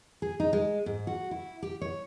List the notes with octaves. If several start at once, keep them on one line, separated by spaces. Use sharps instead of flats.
G#4
D#4
G#3
G#2
F#4
E4
G4
C#5